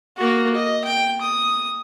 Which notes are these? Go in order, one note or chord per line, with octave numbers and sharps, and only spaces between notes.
A#3 F#4
D#5
G5
D#6